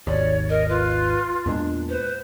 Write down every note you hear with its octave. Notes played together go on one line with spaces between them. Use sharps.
G#1 D#2 C#5 D5
A#4 D#5
F4 B4
E2 A#2 G#3 D4
B4 C5